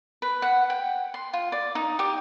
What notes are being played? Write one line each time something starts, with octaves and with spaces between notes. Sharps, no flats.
B4
F#5
G5
C6
F4
D5
D#4
G4